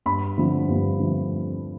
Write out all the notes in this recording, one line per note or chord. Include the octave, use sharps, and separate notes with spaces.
G2 B5
D3 F3 A3 C4
G2
D3 F3 A3 C4